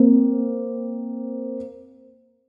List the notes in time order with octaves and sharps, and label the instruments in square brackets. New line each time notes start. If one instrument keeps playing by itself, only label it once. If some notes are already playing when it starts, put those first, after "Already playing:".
Already playing: [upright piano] A#3 C4